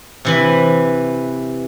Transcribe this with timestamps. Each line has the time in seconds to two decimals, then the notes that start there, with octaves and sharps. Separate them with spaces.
0.25 C3 E3 B4